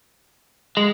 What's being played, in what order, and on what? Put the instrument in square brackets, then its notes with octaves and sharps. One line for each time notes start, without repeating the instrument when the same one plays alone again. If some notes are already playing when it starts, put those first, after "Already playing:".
[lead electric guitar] G#3